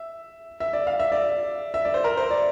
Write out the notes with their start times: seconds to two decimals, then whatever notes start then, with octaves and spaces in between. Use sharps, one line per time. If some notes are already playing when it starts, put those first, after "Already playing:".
Already playing: E5
0.60 E5
0.73 D5
0.87 F5
1.00 E5
1.12 D5
1.74 E5
1.85 D5
1.94 C5
2.04 A#4
2.17 C5
2.31 D5